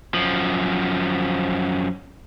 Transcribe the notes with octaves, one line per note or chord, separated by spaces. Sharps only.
F#2 F3